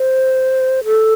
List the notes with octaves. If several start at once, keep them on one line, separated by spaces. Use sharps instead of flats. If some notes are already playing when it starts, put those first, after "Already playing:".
Already playing: C5
A4